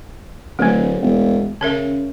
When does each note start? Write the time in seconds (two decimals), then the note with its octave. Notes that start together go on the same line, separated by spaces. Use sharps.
0.59 D1 A3 C4
1.02 E1
1.61 C#3 C#4 A#4 E5